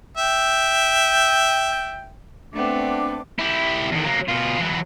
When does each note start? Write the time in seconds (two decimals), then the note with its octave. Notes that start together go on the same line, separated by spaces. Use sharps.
0.18 E5 G5
2.53 A3 B3 C4 D4 D6
3.39 E4 G4
3.91 E2 D#3
4.05 F#3 A#3
4.28 B2 F4
4.59 E3 F#3